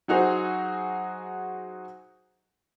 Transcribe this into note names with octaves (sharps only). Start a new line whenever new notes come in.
F#3 D#4 F#4 G#4 C5